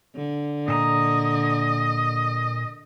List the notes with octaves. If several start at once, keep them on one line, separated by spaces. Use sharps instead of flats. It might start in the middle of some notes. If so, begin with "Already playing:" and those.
D3
A#2 A4 D#5 A#5